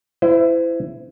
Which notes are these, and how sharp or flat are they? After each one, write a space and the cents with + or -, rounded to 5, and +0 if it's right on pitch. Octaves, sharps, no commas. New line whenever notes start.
E4 +15 C5 -35